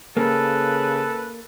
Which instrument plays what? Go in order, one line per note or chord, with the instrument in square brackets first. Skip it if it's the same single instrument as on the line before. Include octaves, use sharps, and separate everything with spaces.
[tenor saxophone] C#3 [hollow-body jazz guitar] A#3 [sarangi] A4 [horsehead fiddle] B4